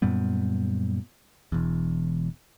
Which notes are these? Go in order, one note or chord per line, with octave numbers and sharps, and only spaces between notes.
F#2 A#2 G3 B3
E1 E2